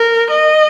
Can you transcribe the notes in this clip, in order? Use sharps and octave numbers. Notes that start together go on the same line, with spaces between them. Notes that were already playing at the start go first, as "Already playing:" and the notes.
Already playing: A#4
D#5